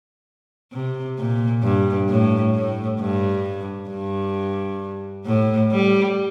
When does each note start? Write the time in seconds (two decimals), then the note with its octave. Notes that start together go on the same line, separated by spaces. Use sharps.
0.72 C3
1.18 A#2
1.63 G2
2.09 A2
2.54 A2
3.00 G2
3.90 G2
5.26 A2
5.72 G3